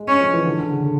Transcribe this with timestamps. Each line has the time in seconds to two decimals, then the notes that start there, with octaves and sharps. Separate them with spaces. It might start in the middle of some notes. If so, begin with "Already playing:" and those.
Already playing: G#3
0.08 C#4
0.21 F3
0.34 E3
0.45 D3
0.58 D3
0.71 C#3
0.84 D3